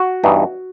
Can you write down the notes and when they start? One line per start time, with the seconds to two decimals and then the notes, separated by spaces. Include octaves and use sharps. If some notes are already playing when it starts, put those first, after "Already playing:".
Already playing: F#4
0.24 G2 E3 B3 D#4